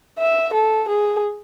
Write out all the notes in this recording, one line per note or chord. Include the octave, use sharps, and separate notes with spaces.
E5
A4
G#4